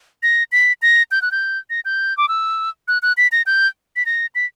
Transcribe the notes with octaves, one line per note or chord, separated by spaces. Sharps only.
A#6
B6
A#6
G6
F#6
G6
A#6
G6
D6
E6
F#6
F#6
B6
A#6
G6
B6
A#6
B6